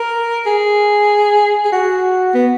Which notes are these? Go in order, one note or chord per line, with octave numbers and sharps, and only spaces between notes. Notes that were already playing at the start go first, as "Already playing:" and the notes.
Already playing: A#4
G#4
G#4
F#4
B3